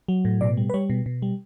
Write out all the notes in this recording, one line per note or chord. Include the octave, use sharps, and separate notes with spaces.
F#3
A2
B2 D5
G3
B4
G3 C#5
B2
B2
G3